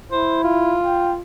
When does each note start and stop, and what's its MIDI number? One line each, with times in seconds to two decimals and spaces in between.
0.12 0.76 64
0.12 0.41 72
0.44 1.23 65
0.85 1.12 79